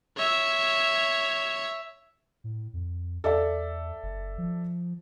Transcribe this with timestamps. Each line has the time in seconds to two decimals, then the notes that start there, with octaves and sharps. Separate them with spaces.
0.17 C#5 E5
2.44 A2
2.73 F2
3.24 E2 A4 D5 E5
4.03 F#1
4.38 F3